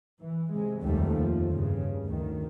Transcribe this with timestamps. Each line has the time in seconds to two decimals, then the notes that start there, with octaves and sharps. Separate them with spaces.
0.21 E3
0.52 C3 G#3
0.82 F1 D#2 G3 A3
1.13 F3
1.49 G2 C#3
2.04 D2 D#3